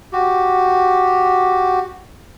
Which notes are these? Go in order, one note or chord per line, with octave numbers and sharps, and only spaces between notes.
F#4 G4